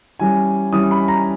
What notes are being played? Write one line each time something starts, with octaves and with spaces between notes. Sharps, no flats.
E3 G3 C#4 G#5
E3 G3 C#4 D#6
B5
A#5